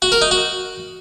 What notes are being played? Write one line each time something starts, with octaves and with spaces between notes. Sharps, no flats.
F#4
A#4
D#4
F#4